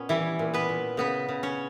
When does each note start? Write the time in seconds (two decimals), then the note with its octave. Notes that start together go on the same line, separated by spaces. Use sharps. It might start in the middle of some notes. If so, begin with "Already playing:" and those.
Already playing: A#2 B3 C#4
0.09 E3 G3 E4
0.39 A#2
0.54 B3 B4
0.69 A#2
0.97 C#3 B3 B4
1.29 C#3
1.43 C#4 C#5